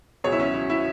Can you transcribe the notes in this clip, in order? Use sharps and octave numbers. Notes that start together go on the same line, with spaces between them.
C#2 B2 F#3 G#4 C#5
E4
C#4
E4
E4